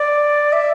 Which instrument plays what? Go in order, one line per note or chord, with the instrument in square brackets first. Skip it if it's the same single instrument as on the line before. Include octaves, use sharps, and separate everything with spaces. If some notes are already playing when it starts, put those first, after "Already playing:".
Already playing: [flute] D5
E5